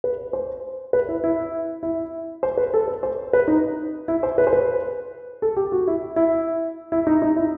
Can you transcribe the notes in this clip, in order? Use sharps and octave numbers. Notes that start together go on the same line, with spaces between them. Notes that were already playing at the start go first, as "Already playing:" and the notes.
B4
C5
B4
E4
E4
E4
C5
B4
A4
B4
C5
B4
D#4
E4
C5
B4
C5
B4
A4
G4
F#4
E4
E4
E4
D#4
D#4
E4